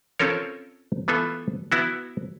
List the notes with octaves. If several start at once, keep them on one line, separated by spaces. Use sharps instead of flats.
C4 C#4 F4 A4 A#4 C#5
E3 B3 F4 A4 E5
B3 E4 F#4